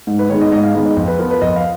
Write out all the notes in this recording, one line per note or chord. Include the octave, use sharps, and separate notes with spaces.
G#2
B4
D#3 G#3 B3 C#5
D#5
G#2 D#5
F5
D#3 G#3 B3
D#5
F2
B4
F3 B3 A#4
B4
F2 D#5
F5